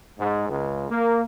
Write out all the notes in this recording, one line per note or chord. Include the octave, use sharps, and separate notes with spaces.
G#2
C#2
A#3